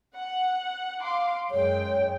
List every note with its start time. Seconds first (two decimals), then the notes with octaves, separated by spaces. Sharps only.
0.15 F#5
1.00 F5 C6 D6
1.51 F#2 G#3 C#5 G5